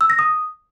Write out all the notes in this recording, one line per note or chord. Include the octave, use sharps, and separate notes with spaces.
E6
A#6
D#6